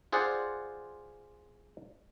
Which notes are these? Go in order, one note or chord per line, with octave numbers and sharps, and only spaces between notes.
F4 G#4 C5 D5 F#5